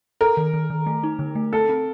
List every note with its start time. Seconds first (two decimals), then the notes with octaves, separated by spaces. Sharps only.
0.21 A4 A#4
0.37 D#3
0.54 D#3
0.70 D#3
0.86 A3
1.03 D#4
1.19 D3
1.35 A3
1.53 C4 A4
1.69 C4